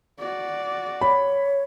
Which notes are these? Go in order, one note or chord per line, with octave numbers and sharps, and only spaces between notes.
F#4 D5
C#5 B5